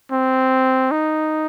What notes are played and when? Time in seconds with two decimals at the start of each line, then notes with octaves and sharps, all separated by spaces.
0.12 C4
0.91 D#4